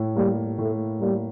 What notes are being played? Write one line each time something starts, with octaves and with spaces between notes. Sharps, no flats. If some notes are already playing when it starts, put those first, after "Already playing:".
Already playing: A2
G3 A#3
A2 A3
G3 A#3